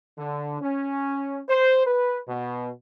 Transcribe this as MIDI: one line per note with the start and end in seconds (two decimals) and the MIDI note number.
0.18 0.59 50
0.61 1.40 61
1.49 1.84 72
1.86 2.19 71
2.28 2.71 47